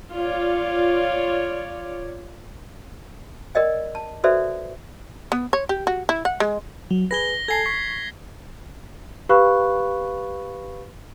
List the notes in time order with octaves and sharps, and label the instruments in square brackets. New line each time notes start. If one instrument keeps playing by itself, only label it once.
[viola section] F4 C#5 D5
[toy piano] A#4 D5 D#5 G5
A5
F#4 A4 B4 C5 D5 E5
[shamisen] B3
C#5
G4
F#4
E4
F#5
G#3
[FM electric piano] F#3
[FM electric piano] G#4 B4 [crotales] A#6 G7
[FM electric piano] A4 G#5 A5 [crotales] G#6 C7
[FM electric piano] C#6 [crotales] B6
[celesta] G4 B4 F5 B5 C#6 F#6